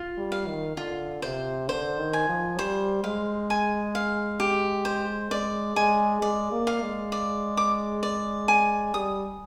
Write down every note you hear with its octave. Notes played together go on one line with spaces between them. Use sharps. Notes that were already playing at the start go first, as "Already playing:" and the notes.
Already playing: F4
G3
F5
D#3
D3 F4
C3 C5
D3 C5
D#3
G#5
F3
G3 C5
G#3 F5
G#5
F5
G4
C5
G#3 D5
G#3 G#5
G#3 D5
A#3
F5
G#3
D5
D6
D5
G#5
G3 D#6